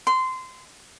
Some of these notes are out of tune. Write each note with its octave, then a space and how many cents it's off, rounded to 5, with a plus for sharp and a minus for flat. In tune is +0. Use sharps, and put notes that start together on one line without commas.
C6 -20